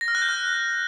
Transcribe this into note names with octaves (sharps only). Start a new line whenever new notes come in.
A#6
F6
F#6
G6
F#6